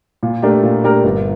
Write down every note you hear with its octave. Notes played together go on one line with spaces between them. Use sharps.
A#2
A3 D4 G4 A#4
A#2
A3 D4 G4 A#4
G1